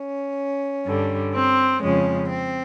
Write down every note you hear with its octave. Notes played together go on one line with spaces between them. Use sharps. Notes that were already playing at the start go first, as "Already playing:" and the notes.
Already playing: C#4
G2 D3 G3
C4
F2 C#3 F3 G#3 C#4
C4